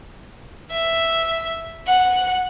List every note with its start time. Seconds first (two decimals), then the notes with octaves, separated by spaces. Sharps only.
0.71 E5
1.87 F#5